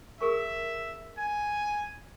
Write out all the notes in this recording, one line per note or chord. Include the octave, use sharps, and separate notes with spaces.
G#4 A#4 E5 C#6
G#5